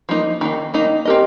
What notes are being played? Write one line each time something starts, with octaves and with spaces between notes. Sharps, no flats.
F3 A#3 D#4
D#3 A#3 D#4
D#3 A#3 D#4
C4 G4 A#4 D#5